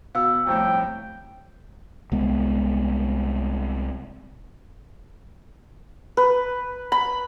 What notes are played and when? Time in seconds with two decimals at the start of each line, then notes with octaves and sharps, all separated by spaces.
0.15 B2 B3 F5 E6
0.47 C2 F2 A2 G5
2.12 C2 G#3 B3
6.17 B4
6.92 B5